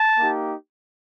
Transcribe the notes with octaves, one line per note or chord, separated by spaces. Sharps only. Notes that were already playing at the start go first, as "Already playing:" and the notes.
Already playing: A5
A#3 D#4 G4